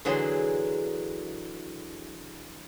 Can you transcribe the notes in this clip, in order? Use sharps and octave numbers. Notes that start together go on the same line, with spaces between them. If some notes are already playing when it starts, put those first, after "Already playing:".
D3 E3 F#3 G#4 C6